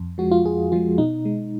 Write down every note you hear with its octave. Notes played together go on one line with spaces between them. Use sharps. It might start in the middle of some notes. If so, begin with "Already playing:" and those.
Already playing: F2
F3 G#3 F#4
F4
F2 G#4
F3 G#3 F4
B2 D#4
G#3